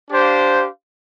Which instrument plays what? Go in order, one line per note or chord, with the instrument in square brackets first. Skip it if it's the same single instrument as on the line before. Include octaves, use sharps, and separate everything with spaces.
[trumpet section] D4 G4 C5 F5